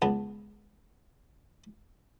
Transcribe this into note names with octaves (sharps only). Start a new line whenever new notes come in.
C#2 B3 A5